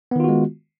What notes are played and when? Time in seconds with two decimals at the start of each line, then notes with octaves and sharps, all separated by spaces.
0.11 B3
0.16 D#3
0.20 F4
0.24 F#4
0.28 G#3